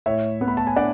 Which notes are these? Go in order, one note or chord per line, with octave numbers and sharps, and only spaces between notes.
A2 C#5 E5
B3
B5
A5
G#5
D4 D5 F#5